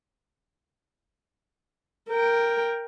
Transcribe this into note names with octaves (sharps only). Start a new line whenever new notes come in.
A#4 G5